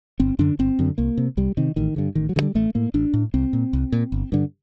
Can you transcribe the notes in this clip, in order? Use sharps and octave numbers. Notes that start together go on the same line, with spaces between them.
G1 C4
F#2 D3 D4
G1 C4
F#2 D3
C2 A#3
C3
C2 G3
C3 D#3
A1 D#3
G2 D3
A1 D#3
F#3
G2 D3
G3
A1 A3
A2 A#3
A1 D4
A2
C2 C4
A#2
C2
A#2
G1
G2 D3